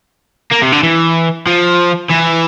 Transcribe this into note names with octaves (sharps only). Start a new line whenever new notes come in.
A#3
C3
D3
E3
F3
E3